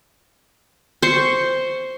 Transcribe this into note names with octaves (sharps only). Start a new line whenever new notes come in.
C5 C#6